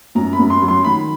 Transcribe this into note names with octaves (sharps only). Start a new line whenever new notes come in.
F#2 A#5
B5
F#2
C6
F#3
C6
D#3 B5